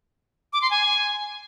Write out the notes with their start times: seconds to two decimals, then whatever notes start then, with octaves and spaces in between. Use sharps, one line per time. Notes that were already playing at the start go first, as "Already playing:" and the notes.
0.53 D6
0.62 C6
0.71 G#5